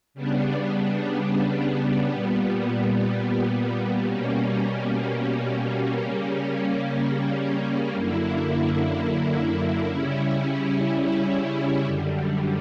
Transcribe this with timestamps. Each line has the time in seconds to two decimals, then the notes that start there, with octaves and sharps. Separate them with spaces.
0.14 C#3 G3 B3 D4
2.09 A#2 G3 B3
4.04 B2 G3 A#3 C#4
5.99 C#3 G3 A#3 C#4
7.95 F#2 D3 A#3 E4
9.89 C#3 G3 C#4 E4
11.84 F#2 D3 G3